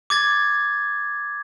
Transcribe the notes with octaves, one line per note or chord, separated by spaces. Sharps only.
D6 G#6 A6